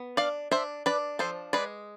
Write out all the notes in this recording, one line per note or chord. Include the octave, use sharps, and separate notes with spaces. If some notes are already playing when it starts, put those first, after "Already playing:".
Already playing: B3
D4 D5 F5
D4 C5 E5
D4 B4 D5
F3 A4 C5
G#3 B4 D5